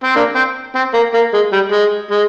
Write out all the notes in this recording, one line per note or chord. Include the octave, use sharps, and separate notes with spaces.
C4
A#3 D4
C4
C4
A#3
A#3
G#3
G3
G#3
G#3